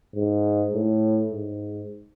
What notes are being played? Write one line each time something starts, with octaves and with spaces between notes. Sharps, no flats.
G#2
A2
G#2